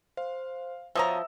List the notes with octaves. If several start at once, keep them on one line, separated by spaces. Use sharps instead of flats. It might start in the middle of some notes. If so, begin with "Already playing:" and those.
C5 F5
B2 F3 C#5 E5 A5 A#5 D#6 E6